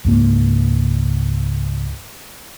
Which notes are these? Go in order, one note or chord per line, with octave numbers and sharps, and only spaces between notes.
C#2 G#2 A#3